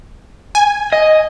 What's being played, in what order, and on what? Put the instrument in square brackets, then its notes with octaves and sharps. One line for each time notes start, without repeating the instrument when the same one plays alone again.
[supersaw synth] G#5
[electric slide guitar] D#5